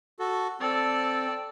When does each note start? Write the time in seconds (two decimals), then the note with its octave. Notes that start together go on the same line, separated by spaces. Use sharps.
0.19 F#4 A4
0.61 C4 A4 D5